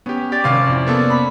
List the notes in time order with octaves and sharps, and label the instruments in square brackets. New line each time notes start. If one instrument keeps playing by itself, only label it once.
[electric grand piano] B3 G4 [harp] C#4
[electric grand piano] G4 [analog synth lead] D5
[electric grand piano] G#1 F5 [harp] C3 C#4
[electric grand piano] F2 E4
A#3 B3 A4
[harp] B5